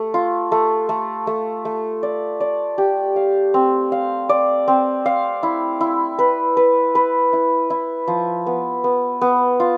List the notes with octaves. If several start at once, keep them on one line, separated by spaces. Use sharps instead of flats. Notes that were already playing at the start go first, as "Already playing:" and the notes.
Already playing: A3
F4
A3
A3
A3
A3
D5
D5
G4
F5
C4
F5
D5
C4
F5
E4
E4
B4
B4
B4
E4
E4
F3
B3
B3
B3
F4